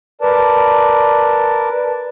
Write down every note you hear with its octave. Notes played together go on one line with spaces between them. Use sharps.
A#4 B4 D5 A5